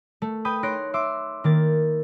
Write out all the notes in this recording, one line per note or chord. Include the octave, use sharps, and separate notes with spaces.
A3
B4 G5 B5 D#6 G6
D#4 C#5 C6 F#6 A#6 D7
E5 C6 D6
D#3 A#3 A6